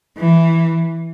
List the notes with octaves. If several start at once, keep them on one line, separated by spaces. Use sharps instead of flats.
E3